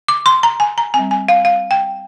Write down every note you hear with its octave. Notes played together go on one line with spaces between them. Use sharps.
D6
C6
A#5
G#5
A#5
C4 G#5
G3
G#5
F5
F5
G5